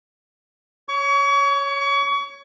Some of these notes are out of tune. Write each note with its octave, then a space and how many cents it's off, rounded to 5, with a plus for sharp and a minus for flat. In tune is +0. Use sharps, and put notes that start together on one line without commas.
C#5 +0 C#6 +35